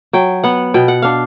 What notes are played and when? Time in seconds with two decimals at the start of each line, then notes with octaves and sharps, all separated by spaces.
0.13 F#3 G5
0.44 B3 F#5
0.74 B2 G5
0.88 F#5
1.02 D4 F5